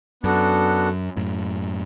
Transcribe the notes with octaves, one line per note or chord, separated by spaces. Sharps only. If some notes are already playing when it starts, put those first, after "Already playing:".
F#2 B3 D4 F#4 A4
F#2 A2